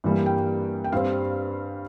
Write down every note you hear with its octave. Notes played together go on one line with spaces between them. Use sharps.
G2 E3 G3 A#3
G5
G5
G2 G3 C4 F5